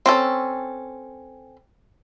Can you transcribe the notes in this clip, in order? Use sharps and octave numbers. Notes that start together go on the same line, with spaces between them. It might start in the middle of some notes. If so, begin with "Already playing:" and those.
C4 C#4 A4